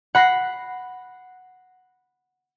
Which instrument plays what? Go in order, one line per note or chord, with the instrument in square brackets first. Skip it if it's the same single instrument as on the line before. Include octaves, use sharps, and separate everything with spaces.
[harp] F#5 B5 A#6 C7